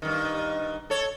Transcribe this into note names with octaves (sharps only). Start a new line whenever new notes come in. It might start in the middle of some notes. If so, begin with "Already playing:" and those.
G2 D#3
A4 C#5